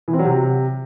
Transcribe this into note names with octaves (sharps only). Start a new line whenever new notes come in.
E3
C4
F#3
C3